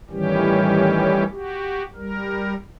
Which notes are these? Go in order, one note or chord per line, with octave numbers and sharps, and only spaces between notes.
A2 D#3 E3 G3 C#4 G4
F#4 G4
G3 A#4